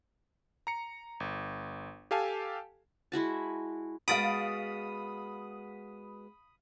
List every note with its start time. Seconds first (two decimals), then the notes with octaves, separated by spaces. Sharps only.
0.67 A#5 C#7
1.20 G1
2.11 G4 A4 F5 G#5 A5
3.12 G#3 E4 F#4 A5
4.08 G#3 B3 F#4 F5 B5 D#6 A6 D7